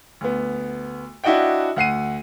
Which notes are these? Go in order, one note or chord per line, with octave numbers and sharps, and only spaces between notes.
D2 B3
D4 E4 F#4 D#5 F#5 G5
D2 F#5 C7 D#7